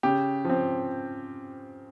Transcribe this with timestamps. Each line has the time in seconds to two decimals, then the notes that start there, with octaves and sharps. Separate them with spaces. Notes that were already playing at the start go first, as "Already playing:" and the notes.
0.03 C#3 G4
0.45 F3 C4